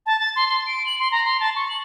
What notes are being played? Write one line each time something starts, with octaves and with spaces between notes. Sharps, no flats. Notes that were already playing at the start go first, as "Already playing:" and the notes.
A5
A6
C6
C6
D7
F#7
C6
A#5
C6
A5
C#6
F#7